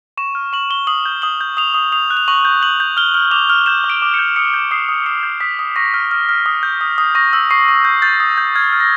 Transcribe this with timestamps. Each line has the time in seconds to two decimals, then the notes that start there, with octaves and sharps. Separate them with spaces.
0.17 C#6 E7
0.35 F6
0.53 C#6 F#7
0.70 C#6 G7
0.87 D#6 F#7
1.06 G6
1.22 D#6 F#7
1.41 G6
1.57 D#6 F7
1.74 D#6
1.92 D#6 F7
2.10 F#6
2.17 F7
2.28 C#6 F#7
2.45 G6
2.62 G6 F#7
2.80 G6
2.97 F6 G7
3.14 F6
3.31 D6 F7
3.49 F6
3.66 G6 E7
3.84 D6
3.90 D7
4.02 D6
4.14 G6 C#7
4.36 D#6 C#7
4.54 G6
4.71 D#6 C7
4.89 D#6
5.06 D#6 C#7
5.23 G6
5.41 D#6 B6
5.59 D#6
5.76 C#6 A#6
5.94 F6
6.11 F6
6.29 F6
6.46 D#6
6.63 G6
6.81 D#6
6.98 D#6
7.15 C#6 A#6
7.33 E6
7.51 C#6 C7
7.68 C#6
7.85 G6
8.02 G6 A6
8.20 D#6
8.38 G6
8.56 F6 G#6
8.73 F6
8.80 A#6